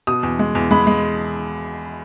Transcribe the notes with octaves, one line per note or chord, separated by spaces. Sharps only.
B2 D#6
E2
G#3
E2
G#3 B5
G#3